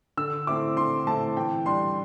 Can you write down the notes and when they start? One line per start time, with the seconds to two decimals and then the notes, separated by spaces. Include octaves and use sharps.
0.17 D3 E6
0.47 A3 C4 E4 D6
0.77 D3 C6
1.07 A3 C4 E4 A5
1.37 E3 G5
1.66 G3 D4 C6